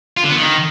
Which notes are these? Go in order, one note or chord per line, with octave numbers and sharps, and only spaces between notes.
F4
D3
B3
D#3